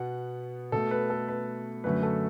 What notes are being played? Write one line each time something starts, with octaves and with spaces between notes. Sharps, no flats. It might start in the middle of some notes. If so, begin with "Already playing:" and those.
Already playing: B2 B3 F#5
B2 A3 A4
B4
A4
B4
F#2 D3 F#3 A3 B4
A4